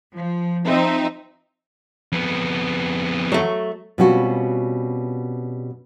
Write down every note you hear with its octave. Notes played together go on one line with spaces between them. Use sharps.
F3
F3 C4 D#4 E5
F2 B3
F#3 A3
B2 G3 C4 C#4 F4 F#4